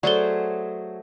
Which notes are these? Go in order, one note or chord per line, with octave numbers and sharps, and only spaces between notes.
F#3 A3 G#4 A4 C5 D5 C#6 G7